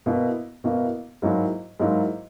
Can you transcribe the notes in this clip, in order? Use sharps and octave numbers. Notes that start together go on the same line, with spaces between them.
B2 A#3 E4
B2 A#3 E4
G#2 F#3 A#3 E4
G#2 F#3 A#3 E4